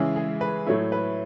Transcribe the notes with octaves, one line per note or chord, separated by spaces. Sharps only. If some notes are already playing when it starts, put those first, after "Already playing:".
Already playing: C#3 E3 G#3 C#4 E4 G#4
G#4
B4
A2 F#3 A3 E4 C#5
B4